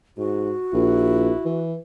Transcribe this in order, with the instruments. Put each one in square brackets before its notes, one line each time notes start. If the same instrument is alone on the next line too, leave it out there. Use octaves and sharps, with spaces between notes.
[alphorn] G#2 [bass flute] F#4
[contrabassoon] A#1 [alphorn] E4
[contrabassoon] E3